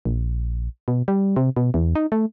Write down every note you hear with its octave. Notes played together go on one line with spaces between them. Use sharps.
A#1
B2
G3
C3
B2
E2
D#4
A3